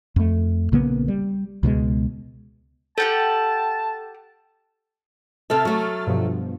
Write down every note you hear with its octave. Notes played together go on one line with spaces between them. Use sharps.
F2 A3
A#1 C#3 A#3 B3
G3
C#2 B2 F3 G#3
G4 A4 F#5 G5 A5 A6
C3 A4 E5 A5 F6 A6
F#3 A3
G2 B2 F3